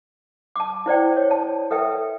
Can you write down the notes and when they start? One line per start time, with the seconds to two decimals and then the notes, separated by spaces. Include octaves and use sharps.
0.56 A5 D6
0.86 E4 C5 D5 G5
1.17 C#5
1.31 A5
1.71 A4 B4 E5 G5